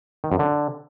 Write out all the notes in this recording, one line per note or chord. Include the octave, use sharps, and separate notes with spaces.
D#3
F#2
D3